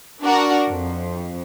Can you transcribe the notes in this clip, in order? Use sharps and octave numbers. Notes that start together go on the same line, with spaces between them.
D4 F#4 A#4
F2